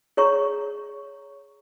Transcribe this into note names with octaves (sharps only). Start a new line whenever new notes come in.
G#4 C#5 A#5 C#6